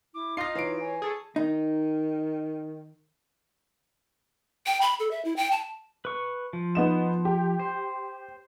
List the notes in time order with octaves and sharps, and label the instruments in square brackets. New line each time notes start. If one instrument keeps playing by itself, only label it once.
[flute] E4 [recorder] D6
[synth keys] D#4 F4 [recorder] F5 [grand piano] A#6 C7
[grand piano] E3 D7 [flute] C#5
[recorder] C#5 [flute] G#5
[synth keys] G#4 A4 C#5 [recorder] A5
[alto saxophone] D#3 [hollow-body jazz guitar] D#4
[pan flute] G5
B5
A4
E5
E4
G5
A5
[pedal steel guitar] B4 C#6
F3
[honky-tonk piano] B3 D#4 E7
G4
[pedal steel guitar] C5